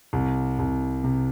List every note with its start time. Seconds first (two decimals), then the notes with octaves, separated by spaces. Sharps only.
0.13 C2
0.59 C2
1.04 C3